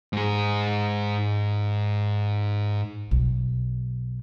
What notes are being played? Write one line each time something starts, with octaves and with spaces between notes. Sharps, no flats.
G#2 G#4
B1